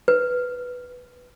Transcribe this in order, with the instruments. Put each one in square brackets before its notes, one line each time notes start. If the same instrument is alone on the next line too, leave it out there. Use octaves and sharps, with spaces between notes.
[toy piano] B4